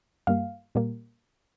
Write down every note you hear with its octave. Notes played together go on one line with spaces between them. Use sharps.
G2 G3 A#3 F5
A#2 G3 A#3